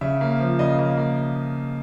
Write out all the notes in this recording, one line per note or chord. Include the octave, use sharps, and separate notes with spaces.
C#3 E5
A#3
F3
C#3 D#5
A#3
A#3